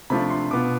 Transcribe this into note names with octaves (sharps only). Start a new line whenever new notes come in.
C3 F3 A3 D4 F4 B5
C6
B2 B3 F4 D6